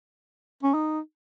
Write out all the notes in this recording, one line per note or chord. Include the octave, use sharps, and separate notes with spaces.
C#4
D#4